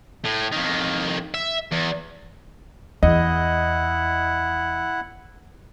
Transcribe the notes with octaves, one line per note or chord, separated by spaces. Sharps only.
A2
F2 D#3
E5
E2
E2 E4 D#5 F#5